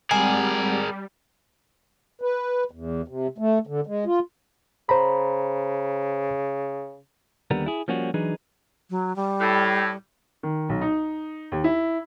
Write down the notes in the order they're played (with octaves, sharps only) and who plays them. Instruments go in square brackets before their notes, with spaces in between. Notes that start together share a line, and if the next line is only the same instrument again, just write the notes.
[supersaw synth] G3 [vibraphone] G#3 C4 F#5 [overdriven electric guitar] G#4 A#4 [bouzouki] G#5
[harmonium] B4
E2
C3
A3
D3
G#3
F4
[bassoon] C#3 [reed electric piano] C5 A#5 B5
[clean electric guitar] D#2 D3 G3 B3 A#4
E4 G#4
F3 G3 A#3 C#4 F4 F#4
E3 F#3 D4 D#4 G#4 B4
[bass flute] F#3
G3
[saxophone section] A2
[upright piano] D#3
B1
D#4
D#2
E4